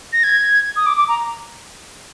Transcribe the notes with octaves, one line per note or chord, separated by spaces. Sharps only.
A#6
G#6
D#6
D6
D6
A#5